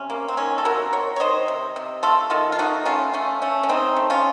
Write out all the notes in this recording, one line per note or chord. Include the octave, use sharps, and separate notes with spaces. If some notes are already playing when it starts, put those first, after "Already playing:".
Already playing: C3 C#4
A#3
C4
D#3 C#4
A4
C3 F#4 A#4
C3 A#4 C#5
C#5
D#3 C5 D#5
C3
C3
A3 F4 A4
D#3 F4 A4
F4
A3 D#4 F#4
A3 C#4 F4
A3 C#4
A3 C#4
C#4
C#3 C4 D#4
A3
C#4 F4